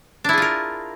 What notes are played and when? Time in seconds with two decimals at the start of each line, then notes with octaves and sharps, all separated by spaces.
0.24 D4
0.29 E4
0.33 G#4
0.38 F4
0.42 A#4